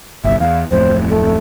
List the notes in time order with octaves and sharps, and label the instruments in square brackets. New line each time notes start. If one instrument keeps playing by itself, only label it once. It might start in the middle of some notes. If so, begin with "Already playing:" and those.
[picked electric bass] G1 C2 [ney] E5
[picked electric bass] E2 [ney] F5
[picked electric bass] D1 F2 A2 [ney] C5
[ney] A3